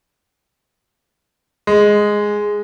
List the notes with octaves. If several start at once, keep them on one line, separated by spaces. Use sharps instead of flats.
G#3